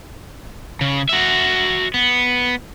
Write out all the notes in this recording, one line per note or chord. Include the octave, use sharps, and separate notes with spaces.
C#3
F#4 E5
B3